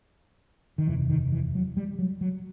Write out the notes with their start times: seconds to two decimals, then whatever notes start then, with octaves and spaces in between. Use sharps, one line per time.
0.78 D#3
0.87 F#1 E2 C3 E3
1.10 D#3
1.32 E3
1.55 F#3
1.77 G3
1.99 F#3
2.21 F#3